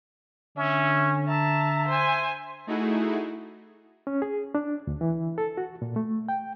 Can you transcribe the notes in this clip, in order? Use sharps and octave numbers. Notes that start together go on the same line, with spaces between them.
D3 C#4 E5
E5 A5 A#5
C5 G#5
A3 D#4 E4 F#4 G#4
C#4
G#4
D4
D2
E3
A4
F#4
A#2
A3
G5